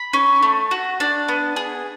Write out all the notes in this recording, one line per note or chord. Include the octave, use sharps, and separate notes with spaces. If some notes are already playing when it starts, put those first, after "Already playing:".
Already playing: B5
C#4
A3
F#4
D4
B3
G#4